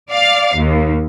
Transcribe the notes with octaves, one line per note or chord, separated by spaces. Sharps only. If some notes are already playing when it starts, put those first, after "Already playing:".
D5 F5
D#2